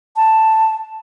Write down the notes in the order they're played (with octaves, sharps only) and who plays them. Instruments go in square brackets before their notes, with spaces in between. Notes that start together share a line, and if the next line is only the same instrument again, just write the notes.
[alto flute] A5